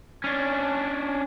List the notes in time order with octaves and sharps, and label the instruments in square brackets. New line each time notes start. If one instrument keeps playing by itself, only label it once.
[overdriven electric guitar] C#4 D4